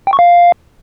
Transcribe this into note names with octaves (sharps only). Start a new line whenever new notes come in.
G5
C#6
F5